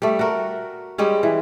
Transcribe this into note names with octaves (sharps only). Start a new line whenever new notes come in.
G3 A3
F#4 A#4
G3 G#3 C#4
E3